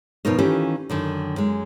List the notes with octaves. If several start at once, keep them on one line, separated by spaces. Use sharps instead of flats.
F#2 B2 F3 D#4 A#4 C#5
D#3 E3 C#4 F4 G4 A4
F#2 D3 D#3
F#2 G#3